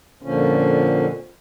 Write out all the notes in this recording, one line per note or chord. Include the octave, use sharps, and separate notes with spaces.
F2 A#2 D3 F3 C#4